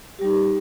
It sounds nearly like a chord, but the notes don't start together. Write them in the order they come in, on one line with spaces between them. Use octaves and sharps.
G4 G3 D#4